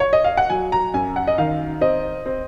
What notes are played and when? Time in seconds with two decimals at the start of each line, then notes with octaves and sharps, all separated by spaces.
0.00 C#5
0.13 D#5
0.24 F5
0.37 F#5
0.50 F#3 G#5
0.72 A#5
0.94 F#2 G#5
1.16 F#5
1.27 D#5
1.38 D#3 F5
1.81 C4 D#5
2.26 C4